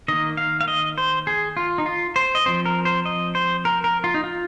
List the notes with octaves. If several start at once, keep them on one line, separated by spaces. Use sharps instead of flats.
D#3 A#3 D#5
F5
F5
D#5
C5
G#4
F4
D#4
F4
C5
D#5
F3 C4 C5
A#4
C5
D#5
C5
A#4
A#4
F4
D#4
F4